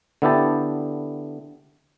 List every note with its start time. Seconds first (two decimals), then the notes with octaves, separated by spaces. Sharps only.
0.22 D3 B3 E4 G4 A5